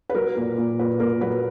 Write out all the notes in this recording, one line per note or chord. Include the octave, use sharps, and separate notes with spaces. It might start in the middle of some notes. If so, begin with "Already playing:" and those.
B4
F#3 A#4
A#2
A#2
A#2 B4
A#2 A#4
F#3 B4